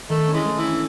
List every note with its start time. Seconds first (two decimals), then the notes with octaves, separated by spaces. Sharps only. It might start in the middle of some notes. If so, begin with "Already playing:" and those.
0.09 D#3 A3
0.28 C#4
0.33 E3 G#3
0.45 A3
0.57 E3
0.63 C#4